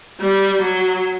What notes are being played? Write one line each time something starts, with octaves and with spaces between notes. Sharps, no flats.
G3
F#3